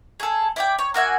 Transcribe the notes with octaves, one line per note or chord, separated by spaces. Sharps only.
G#4 A4
E4 D5 G5
C#5
A#3 F#4 E5 G#5